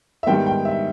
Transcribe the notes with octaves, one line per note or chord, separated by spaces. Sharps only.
E5
G#2 D#3 G3 B3 G5
G5
E5